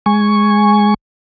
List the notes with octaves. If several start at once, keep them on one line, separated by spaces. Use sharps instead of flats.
G#3 G#5 C#6